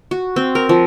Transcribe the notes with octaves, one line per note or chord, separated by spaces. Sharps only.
F#4
C4
A#4
F3